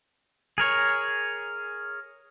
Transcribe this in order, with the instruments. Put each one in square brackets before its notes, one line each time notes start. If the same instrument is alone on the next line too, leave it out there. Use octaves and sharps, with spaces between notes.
[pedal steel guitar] G#4 A#4 C#5